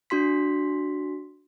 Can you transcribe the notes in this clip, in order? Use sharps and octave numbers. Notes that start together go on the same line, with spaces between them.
D4 F#4 C6 B6